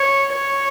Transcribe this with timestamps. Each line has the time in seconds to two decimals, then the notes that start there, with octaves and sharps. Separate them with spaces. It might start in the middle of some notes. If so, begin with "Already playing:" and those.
Already playing: C#5
0.33 C#5